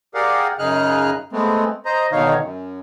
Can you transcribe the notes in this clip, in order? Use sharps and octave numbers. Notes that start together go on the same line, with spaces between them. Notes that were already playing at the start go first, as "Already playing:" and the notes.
G4 G#4 A#4 D5 F5 F#5
F#2 C#3 D#4 G#4 F6 F#6
G#3 A3 B3 C4
C5 D#5 A#5
B2 D3 D#3 D#4 C#5 F5
F#2